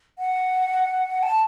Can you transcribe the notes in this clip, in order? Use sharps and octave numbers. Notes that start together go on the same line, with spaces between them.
F#5
A5